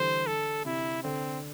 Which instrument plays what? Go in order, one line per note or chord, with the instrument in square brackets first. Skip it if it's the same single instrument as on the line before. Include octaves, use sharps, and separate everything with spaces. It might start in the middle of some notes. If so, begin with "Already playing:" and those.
Already playing: [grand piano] D3 E3 G3 [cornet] C5
[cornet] A4
[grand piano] C3 [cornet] E4
[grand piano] D3 [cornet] C4